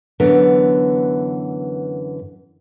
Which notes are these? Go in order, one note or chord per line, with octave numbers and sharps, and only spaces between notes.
F#2 D3 E3 B3